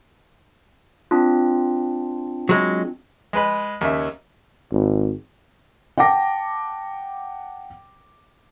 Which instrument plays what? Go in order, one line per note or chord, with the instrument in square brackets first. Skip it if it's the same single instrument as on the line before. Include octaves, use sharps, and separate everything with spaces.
[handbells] C4 D4 F4
[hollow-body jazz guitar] F#3 G#3
[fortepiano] G#3 B4 B5
D#2 C#3 E5
[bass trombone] G#1
[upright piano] F#5 G5 A5 D6 A#6